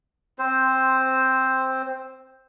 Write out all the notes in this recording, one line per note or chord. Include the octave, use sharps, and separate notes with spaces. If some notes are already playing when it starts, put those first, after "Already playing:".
C4 C5